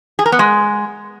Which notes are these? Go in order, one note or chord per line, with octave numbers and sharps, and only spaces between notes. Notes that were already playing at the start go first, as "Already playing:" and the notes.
G#4
A#4
B3
G#3